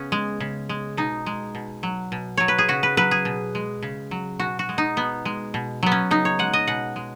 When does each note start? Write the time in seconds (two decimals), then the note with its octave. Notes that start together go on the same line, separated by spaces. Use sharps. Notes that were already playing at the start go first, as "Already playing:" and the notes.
Already playing: C#3 B3 C#4
0.12 G#3
0.40 C#3
0.69 G#3
0.97 B2 D#4
1.26 G#3
1.55 B2
1.83 F#3
2.12 B2
2.37 F#3 C#5
2.48 B4
2.58 G#4
2.68 C#3 F#4
2.83 B4
2.97 F#3 B4
3.11 G#4
3.25 B2
3.55 G#3
3.83 C#3
4.11 F#3
4.39 B2 F#4
4.59 F#4
4.69 G#3
4.78 D#4
4.97 B2 B3
5.25 G#3
5.54 B2
5.83 F#3 B3
5.92 C#4
6.11 C#3 D#4
6.25 C#5
6.39 G#3 F#5
6.53 D#5
6.67 B2 F#5
6.96 G#3